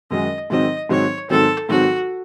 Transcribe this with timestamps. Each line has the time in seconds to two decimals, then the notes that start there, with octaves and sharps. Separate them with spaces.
0.11 F#2 D#3 G#3 D#4 F#4 D#5
0.50 G#2 D#3 F#3 C4 D#5
0.89 G#2 D#3 F#3 C4 C#5
1.30 G#2 D#3 F#3 C4 A4
1.69 G#2 D#3 F#3 C4 F#4